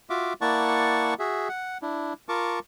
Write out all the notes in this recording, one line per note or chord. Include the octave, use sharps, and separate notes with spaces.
F4 F#4 E5 D6
A#3 E4 D5 F#5 A5 C#6
F#4 G#4 E5
F#5
D4 E4
F4 A#4 A5 C#6 D6